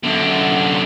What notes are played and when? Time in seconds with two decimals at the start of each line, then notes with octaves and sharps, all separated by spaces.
0.03 F#2 D3